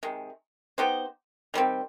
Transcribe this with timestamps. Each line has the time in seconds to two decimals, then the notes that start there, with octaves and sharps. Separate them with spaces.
0.03 C3 D#3 G#3
0.78 B3 D#4 G4 C5
1.54 D#3 G3 C4